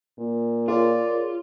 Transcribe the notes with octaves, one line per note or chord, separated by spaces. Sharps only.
A#2
F4 G#4 A#4 C#5 D5